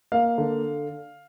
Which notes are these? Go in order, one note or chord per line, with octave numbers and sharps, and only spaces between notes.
A#3 F5
D3